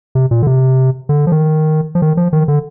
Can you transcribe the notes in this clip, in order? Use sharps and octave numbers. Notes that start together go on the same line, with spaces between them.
C3
A#2
D3
C3
D3
F3
D#3
F3
D#3
F3
D#3
D3